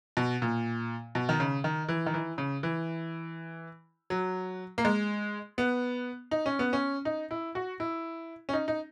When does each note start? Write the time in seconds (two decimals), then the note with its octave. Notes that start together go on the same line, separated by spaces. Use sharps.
0.17 B2
0.42 A#2
1.15 B2
1.29 D#3
1.40 C#3
1.64 D#3
1.89 E3
2.06 D#3
2.14 E3
2.38 C#3
2.63 E3
4.10 F#3
4.78 A#3
4.85 G#3
5.58 B3
6.31 D#4
6.46 C#4
6.59 B3
6.73 C#4
7.05 D#4
7.31 E4
7.55 F#4
7.80 E4
8.49 C#4
8.53 D#4
8.68 D#4